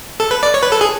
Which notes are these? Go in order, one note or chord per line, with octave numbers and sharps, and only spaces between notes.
A4
B4
D5
C#5
B4
A4
G#4